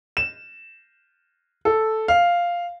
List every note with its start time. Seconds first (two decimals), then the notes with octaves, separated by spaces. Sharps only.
0.17 E7
1.65 A4
2.08 F5